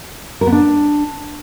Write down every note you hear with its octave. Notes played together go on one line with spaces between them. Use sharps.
A#4
B3
D4